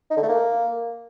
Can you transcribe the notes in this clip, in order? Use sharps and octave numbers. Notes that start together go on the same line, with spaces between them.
D#4
D3
A3
A#3